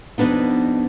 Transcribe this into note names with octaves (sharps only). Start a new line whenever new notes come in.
F2 B2 D3 B3 D4 D#4